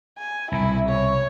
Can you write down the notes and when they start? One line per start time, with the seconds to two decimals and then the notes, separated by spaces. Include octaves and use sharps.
0.19 G#5
0.52 C2 B2 E4
0.89 C#5